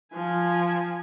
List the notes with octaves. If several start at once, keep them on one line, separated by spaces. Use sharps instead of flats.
F3 G#5